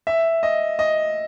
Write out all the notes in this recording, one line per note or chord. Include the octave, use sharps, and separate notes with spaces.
E5
D#5
D#5